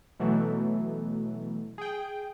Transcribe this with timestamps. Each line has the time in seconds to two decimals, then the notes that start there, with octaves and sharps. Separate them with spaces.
0.20 B2 E3 F#3 A3
1.78 G#4 G5